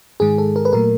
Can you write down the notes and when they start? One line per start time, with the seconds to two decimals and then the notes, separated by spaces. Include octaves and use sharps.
0.20 G#2 D#3 G#3 G#4
0.38 A4
0.56 A#4
0.65 B4
0.73 A#2 F#3 A3 A#4